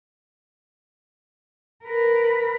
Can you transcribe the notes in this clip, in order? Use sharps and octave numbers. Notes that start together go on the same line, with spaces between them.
A#4 B4